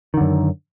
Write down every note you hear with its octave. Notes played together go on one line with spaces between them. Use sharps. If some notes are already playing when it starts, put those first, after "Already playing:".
F#2 D3 D#3